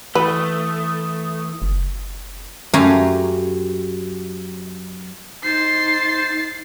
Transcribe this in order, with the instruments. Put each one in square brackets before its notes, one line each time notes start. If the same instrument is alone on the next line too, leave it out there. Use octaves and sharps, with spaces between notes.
[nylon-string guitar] E3 [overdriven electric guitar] A3 [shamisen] B4 [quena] D#6
[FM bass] F#1
[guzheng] F#2 A3 G4 F5 G#5 A#5
[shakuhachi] D#4 [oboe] C5 [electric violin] A6 C7